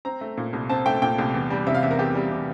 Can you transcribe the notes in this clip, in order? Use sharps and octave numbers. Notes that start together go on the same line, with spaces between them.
C4 A#5
A3
A#2
C2
C4 A5
A3 G5
A#2 G5
C2
E2
G3
C3 E5
F5
E2 E5
A#4
E2 G4
G3
C3